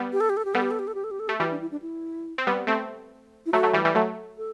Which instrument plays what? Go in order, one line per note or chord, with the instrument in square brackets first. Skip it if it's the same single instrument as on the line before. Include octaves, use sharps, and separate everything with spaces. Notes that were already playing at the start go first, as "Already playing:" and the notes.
Already playing: [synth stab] G3 B3
[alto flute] G4
A4
G4
A4
G4
[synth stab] G3 B3 [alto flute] A4
[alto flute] G4
A4
G4
A4
G4
A4
G4
A4
[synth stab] A3 [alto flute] G4
[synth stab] E3 G3 [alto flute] F#4
[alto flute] D4
E4
D4
E4
[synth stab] C4
G3 B3
A3 C4
[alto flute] E4
[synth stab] F#3 A3 [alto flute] F#4
[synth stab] F#3 A3
E3 G3
E3 G3
F#3 A3
[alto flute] A4